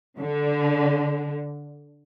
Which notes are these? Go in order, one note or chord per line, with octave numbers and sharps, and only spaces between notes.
D3